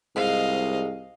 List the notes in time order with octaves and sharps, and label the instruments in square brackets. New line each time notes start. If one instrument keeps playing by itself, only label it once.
[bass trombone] C2 [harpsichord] G#2 [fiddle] D#5 F5